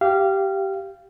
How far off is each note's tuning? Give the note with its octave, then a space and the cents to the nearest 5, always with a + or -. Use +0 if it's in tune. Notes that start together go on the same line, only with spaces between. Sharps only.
G4 -15 F5 -20